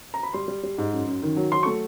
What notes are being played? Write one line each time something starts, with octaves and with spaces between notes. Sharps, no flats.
A#5
B5
G3 C6
G3
G3
G#2
F#2
F#2
D#3
F#3
F#3 C6
A3 C#6